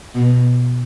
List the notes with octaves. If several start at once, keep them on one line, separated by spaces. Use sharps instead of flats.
B2